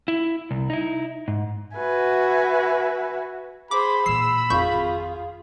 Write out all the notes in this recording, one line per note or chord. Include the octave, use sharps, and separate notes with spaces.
E4
C2
D#4 E4
G#2
F#4 B4 E5 G#5
G#4 C5 B5 D6
A#2 E3 E6 C7
G#1 F2 F4 G#4 C#6 G6